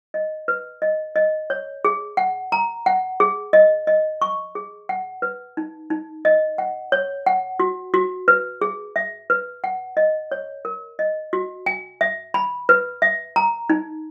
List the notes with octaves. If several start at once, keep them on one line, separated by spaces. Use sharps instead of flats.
D#5
B4
D#5
D#5
C#5
G#4
F#5
A#5
F#5
G#4
D#5
D#5
C#6
G#4
F#5
B4
D#4
D#4
D#5
F#5
C#5
F#5
F#4
F#4
B4
G#4
E5
B4
F#5
D#5
C#5
A#4
D#5
F#4
G#5
E5
B5
B4
E5
A#5
D#4